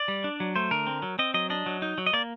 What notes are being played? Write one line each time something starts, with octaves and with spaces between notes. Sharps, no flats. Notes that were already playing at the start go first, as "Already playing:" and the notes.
Already playing: D5
G3
D4
F#3
A3 C5
D3 A#4
C4
F#3
C4 D#5
F#3 D#5
D4 D#5
F#3
D#4
F#3
D#5
A#3 D5